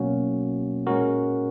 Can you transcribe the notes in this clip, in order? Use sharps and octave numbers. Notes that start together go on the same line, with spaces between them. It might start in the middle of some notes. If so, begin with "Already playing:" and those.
Already playing: B2 F#3 A#3 C#4 F#4
A#2 G#3 C#4 F#4 A#4